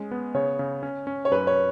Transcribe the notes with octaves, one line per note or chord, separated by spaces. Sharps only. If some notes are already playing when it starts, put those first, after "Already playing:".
Already playing: G#3 C#4
B3
C#3 C#5
C#3
C#4
C#4
C#5
F#2 B4
C#5